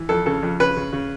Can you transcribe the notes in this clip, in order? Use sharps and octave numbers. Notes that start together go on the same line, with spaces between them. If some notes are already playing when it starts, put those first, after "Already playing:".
Already playing: E3
F2 A4
C#3 A4
F2
C#3 B4
C#3
C#3